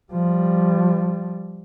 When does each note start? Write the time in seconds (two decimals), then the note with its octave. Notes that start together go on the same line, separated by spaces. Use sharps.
0.13 F3 G3